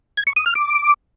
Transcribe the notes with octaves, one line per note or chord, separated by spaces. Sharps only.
G#6
C#6
D#6
F6
D6